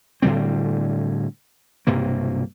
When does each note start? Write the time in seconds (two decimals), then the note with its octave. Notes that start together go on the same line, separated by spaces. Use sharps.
0.22 A2 D3 G3 C4
1.87 B1 G2 C3 A#3